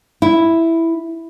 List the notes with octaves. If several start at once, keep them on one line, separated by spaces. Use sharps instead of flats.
E4